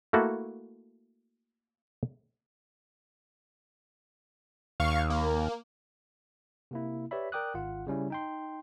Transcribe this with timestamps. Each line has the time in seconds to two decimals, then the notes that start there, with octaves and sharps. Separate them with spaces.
0.13 A3 A#3 E4 F#4 A4
4.80 D#2 F5 C#6
5.10 A#3
6.71 C3 A#3 E4
7.11 G4 B4 C#5 D5 E5 B5
7.32 A#4 D5 G5 D6 D#6 F#6
7.54 G#1 F4 F#5
7.87 C#3 G3 C#4 E4
8.10 D#4 G5 C6